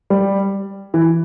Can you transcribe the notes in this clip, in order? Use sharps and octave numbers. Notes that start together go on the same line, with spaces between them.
G3
E3